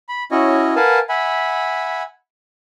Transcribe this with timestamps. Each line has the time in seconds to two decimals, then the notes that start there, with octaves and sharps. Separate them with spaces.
0.09 B5
0.31 C#4 E4 F#4 C#5 D#5
0.76 A#4 B4 F5 F#5 G#5 A5
1.09 E5 F#5 G#5 B5